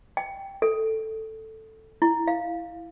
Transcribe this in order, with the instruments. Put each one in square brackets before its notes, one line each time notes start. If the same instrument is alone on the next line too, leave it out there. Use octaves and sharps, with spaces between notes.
[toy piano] G5
A4
E4
F5